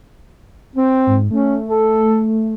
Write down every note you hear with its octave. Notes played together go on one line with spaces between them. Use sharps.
C4 G5
G#2
A3 C#4
A4